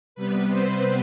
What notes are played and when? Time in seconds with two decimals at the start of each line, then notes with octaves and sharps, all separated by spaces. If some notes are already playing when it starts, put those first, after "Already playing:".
0.15 C3 G3 B3 B4
0.49 C4 C5